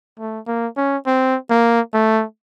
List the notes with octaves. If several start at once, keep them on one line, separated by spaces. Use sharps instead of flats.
A3
A#3
C#4
C4
A#3
A3